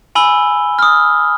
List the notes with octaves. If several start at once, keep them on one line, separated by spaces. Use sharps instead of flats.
G#5 B5 E6 G7
D#6 F6